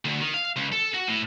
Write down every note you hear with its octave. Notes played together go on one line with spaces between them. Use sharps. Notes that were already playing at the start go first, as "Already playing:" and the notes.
D2
D#3
F5
C#2
A4
F#4
A2